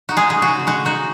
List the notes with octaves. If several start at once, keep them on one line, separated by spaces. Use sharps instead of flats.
D#4 F#4
G#3 G#4
C#3 G#4
F#4
C#3
G#3 F#4
D#4 F#4